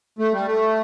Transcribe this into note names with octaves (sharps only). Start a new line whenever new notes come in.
A3
G3
A3